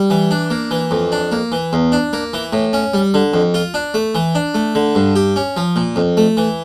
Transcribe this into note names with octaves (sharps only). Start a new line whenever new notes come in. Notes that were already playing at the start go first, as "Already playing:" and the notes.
Already playing: G3
E3
D4
A#3
E3
F2
D4
A#3
E3
E2
D4
A#3
E3
A2
C#4
G3
D3
F2
F4
D4
A3
E3
D4
A3
D3
G2
G4
C#4
F3
A#2
F2
A3
E3